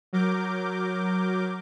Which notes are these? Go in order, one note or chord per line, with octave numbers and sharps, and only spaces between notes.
F#3 A#4 D6 G6